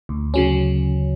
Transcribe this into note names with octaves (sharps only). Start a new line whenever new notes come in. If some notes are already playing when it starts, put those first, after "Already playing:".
D2
C#3 F#3 C#4